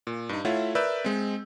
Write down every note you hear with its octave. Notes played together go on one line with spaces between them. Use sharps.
A#2
G2 D#4
A3 E4 F4 C#5 E5 F#5
A#4 B4 D5 E5 E6 G6
G#3 C4